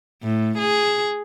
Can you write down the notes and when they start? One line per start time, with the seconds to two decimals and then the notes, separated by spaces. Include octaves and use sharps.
0.23 A2
0.58 G#4